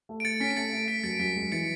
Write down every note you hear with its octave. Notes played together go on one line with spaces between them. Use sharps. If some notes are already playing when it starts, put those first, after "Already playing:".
A3
D7
A3 A6 C#7
C#4 B6
D7
A3 A6 C#7
A3
A3 B6 D7
F#2 A6 C#7
F#2 B6
G#3
E3 A6 C#7